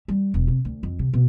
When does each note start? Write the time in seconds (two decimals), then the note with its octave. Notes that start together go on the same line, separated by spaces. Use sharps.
0.08 G3
0.34 E1
0.48 C3
0.65 D2
0.83 F2
0.99 C3
1.13 B2